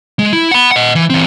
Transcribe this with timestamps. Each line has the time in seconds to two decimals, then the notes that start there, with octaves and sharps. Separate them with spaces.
0.19 G#3
0.33 E4
0.51 F#5 B5
0.72 D#5 F#5
0.95 E3
1.10 E3 C4